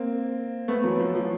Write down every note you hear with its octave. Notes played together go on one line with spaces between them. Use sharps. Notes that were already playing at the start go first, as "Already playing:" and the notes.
Already playing: A#3 C4
A3 B3
E3 F#3
F3
F3